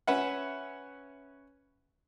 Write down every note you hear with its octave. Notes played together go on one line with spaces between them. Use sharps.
C#4 B4 E5 F#5